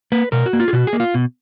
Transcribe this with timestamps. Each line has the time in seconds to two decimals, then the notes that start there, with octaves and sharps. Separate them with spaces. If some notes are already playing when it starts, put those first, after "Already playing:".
0.12 A#3 B4
0.32 B2 A#4
0.46 F#4
0.53 A#3
0.60 F4
0.68 G#4
0.73 B2 F#4
0.87 G#4
0.93 A#3
1.00 F4
1.14 B2